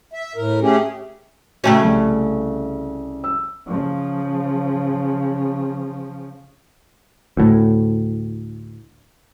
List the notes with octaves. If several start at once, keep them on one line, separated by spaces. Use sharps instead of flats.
E5
A2 A#4
A3 C#4 G4 G#4
C#3 A3 C#4 F#4 G5 A#5
C2
E6
C#3 F3
D2 A2